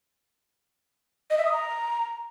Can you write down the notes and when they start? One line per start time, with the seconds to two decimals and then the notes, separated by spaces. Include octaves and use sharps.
1.30 D#5
1.38 E5
1.45 D#6
1.52 A#5